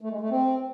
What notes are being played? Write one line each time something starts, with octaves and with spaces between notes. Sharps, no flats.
A3
G#3
A3
C4